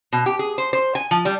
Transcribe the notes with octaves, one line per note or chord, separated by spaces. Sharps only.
B2
G4
G#4
C5
C5
G#5
F3
G3